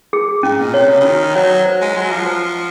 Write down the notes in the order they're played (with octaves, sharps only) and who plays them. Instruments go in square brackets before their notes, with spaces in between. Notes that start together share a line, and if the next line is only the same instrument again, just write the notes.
[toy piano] G#4
[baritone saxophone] G#2 [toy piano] C#4
[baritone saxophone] A#2
[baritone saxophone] C3 [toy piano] C#5
[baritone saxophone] C#3
C#3
[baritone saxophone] D#3 [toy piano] F#4
[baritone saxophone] F#3 [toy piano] C#5
[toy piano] C5
[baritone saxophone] G#3
[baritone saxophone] F#3 [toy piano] C6
[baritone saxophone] F3
[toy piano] C5